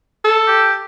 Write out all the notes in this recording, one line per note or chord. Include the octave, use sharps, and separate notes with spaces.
A4
G4